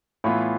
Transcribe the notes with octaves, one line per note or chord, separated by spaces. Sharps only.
A2 E3 B3 F4